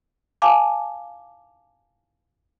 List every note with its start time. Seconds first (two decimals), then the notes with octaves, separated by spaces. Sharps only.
0.42 F5 G#5 A5 D6